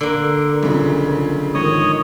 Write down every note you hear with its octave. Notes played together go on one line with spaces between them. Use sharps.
D3 A#3
B1 C#3 F3
G#2 D#3 F3 C#5 D#5 D#6